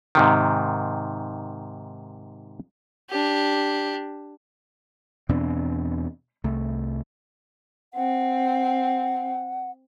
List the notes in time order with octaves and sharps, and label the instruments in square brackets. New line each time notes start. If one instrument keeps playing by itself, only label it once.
[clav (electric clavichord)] G#2 C3 D#3
[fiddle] D4 G4
[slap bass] E2 B2 C4 D4
C2 A3
[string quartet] C4 [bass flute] F#5